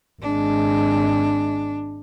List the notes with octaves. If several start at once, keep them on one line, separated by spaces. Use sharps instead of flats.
G#1 G#3 D4